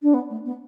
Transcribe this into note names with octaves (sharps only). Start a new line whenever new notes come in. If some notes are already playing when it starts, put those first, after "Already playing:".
D4
B3
A3
B3